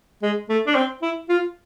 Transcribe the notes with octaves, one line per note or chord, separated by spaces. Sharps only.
G#3
A3
D4
C4
E4
F4